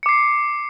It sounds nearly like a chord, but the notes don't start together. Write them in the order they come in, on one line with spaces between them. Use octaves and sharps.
C#7 D6 C7